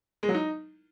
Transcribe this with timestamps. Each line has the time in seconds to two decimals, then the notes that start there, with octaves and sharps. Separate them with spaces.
0.23 G#3
0.29 F#3
0.34 D#4